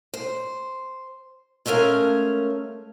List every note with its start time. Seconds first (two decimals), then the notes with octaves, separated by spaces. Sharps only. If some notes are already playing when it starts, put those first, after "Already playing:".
0.14 C5
1.66 G#3 A3 C#4 A#4 F5